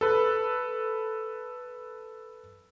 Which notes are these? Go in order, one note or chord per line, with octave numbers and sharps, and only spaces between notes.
A4 B4